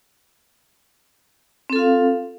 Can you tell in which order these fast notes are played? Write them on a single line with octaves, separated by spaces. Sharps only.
C4 A4 F4 F5